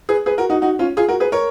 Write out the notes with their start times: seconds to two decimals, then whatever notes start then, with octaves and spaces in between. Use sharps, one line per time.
0.09 G#4 B4
0.26 G#4 B4
0.38 F#4 A#4
0.50 D#4 F#4
0.62 D#4 F#4
0.79 C#4 F4
0.97 F4 G#4
1.09 F#4 A#4
1.20 G#4 B4
1.32 A#4 C#5